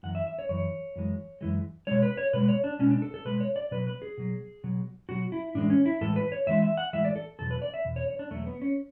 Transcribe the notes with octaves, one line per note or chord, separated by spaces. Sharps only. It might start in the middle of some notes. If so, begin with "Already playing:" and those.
F#2 E3 F#5
E5
E5
C#5
F#2 E3 C#5
F#2 E3 G#3
F#2 E3 G#3
B2 G#3 C#5
B4
C#5
B2 G#3 B4
C#5
D4
B2 G#3 C#4
D4
A4
A4
B2 G#3 B4
C#5
D5
B2 F#3 B4
B4
G#4
B2 F#3
B2 F#3
B2 F#3 F#4
E4
A2 E3 G#3 D4
C#4
E4
A2 E3 G#3 A4
B4
C#5
A2 E3 G#3 E5
E5
F#5
A2 E3 G#3 E5
D5
A4
E2 B2 F#3 A4
B4
D5
E5
E2 B2
C#5
C#5
D4
E2 B2 F#3 A3
B3
C#4